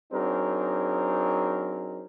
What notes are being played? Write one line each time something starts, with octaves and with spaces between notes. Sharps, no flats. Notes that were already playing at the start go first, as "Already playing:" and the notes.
F#3 C4 D4 D#4 G#4 A#4